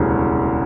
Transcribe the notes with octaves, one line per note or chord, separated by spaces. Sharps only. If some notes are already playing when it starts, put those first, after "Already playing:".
Already playing: E1 D2 C#3 E3 G3